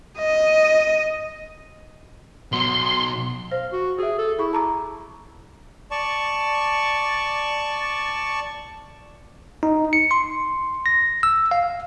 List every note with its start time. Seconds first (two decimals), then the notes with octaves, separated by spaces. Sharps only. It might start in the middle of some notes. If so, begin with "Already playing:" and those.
0.18 D#5
2.53 B2 F#3 C6
3.51 C5 F5
3.72 F#4
3.99 F#4 G#4 E5
4.18 A4
4.39 E4 G#4 C#6
4.53 A5 A#5 D6
5.91 D5 A5 C#6
9.63 D#4
9.93 C#7
10.11 C6
10.86 A#6
11.23 E6
11.51 F5